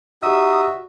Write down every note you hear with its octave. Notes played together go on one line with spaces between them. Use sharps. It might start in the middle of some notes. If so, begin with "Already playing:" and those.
D#4 F#4 G4 E5 D#6 E6